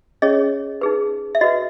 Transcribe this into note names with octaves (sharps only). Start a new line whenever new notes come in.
C#4 G#4 C#5 D#5
D#4 G#4 B4
E5
F#4 B4 D#5